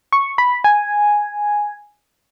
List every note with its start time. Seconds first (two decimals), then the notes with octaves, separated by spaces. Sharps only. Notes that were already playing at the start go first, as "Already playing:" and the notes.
0.13 C#6
0.38 B5
0.64 G#5